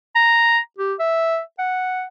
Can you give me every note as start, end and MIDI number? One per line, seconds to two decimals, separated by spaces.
0.15 0.58 82
0.78 0.94 67
0.99 1.40 76
1.59 2.05 78